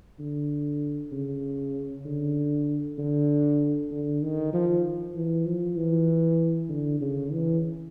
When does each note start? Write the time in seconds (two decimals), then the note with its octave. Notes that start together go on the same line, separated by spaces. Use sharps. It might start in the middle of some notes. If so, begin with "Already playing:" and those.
0.19 D3
1.12 C#3
2.05 D3
2.98 D3
3.91 D3
4.22 D#3
4.53 F3
5.15 E3
5.46 F3
5.76 E3
6.69 D3
7.01 C#3
7.32 E3